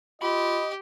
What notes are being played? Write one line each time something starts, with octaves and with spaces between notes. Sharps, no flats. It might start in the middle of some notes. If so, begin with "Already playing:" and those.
F4 G4 D#5 B5